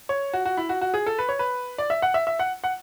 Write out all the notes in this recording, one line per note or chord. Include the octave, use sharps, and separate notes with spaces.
C#5
F#4
F#4
E4
F#4
F#4
G#4
A4
B4
C#5
B4
D5
E5
F#5
E5
E5
F#5
F#5